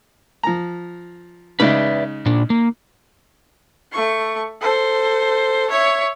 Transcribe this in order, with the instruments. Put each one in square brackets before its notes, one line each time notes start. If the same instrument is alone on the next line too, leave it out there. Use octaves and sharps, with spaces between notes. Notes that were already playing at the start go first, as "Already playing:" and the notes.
[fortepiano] F3 A#5
[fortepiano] C#3 G#3 D#4 [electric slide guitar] B4 D5 E5
[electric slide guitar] A#2 D4
A#3
[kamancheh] A3 C#6
A4 C5
C#5 E5